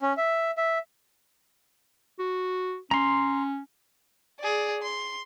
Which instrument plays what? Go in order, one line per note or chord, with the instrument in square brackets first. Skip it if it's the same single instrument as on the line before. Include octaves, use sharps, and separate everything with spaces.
[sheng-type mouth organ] C#4
E5
E5
[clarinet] F#4
[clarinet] C#4 [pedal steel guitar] A#5 C6
[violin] G#4 D5
C6